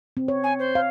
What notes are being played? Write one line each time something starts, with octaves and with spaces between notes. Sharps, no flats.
C4
C#5
G#5
C5
F5